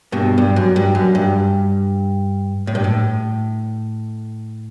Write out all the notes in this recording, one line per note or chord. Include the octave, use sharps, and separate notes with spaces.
G2 B2
G2
F#2
G2
F#2
G2
A2
G2
A2